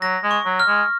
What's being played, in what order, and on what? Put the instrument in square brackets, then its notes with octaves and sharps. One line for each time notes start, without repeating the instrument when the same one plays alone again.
[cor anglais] F#3 [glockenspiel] A#6
[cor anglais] G#3
[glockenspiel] C#6
[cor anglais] F#3
[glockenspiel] F6
[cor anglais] G#3